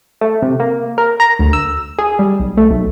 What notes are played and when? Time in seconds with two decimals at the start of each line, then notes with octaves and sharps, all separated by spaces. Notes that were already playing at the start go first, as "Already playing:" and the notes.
0.21 A3
0.42 C3
0.60 A#3
0.98 A#4
1.20 A#5
1.39 D2
1.53 E6
1.99 G#4
2.19 G3
2.40 B1
2.57 A3
2.70 B1